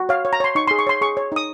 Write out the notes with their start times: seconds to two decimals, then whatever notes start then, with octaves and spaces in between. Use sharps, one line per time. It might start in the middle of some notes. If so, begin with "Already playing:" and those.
Already playing: F#4
0.09 C#5 F5
0.25 C#5
0.33 A#5
0.40 C#5 C6
0.55 D#4 C#6
0.68 C6
0.71 G#4
0.79 C#6
0.87 C#5 C6
1.01 G#4 C#6
1.17 C#5
1.32 D#4 D#6